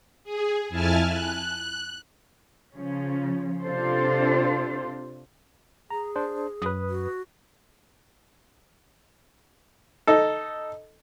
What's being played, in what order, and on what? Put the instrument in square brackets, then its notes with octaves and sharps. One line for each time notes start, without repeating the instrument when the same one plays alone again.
[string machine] G#4
F2 E4 G#5 A5 F6
F#6
[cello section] C#3 F3 C#4
C3 C4 D4 F4 A4 C5
[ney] G#4 [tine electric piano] A#5
[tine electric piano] D4 C5
[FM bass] F#2 [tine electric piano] B4 D#6
[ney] F#4
[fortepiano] D#4 A4